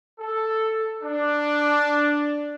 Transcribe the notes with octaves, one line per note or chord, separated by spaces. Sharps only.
A4
D4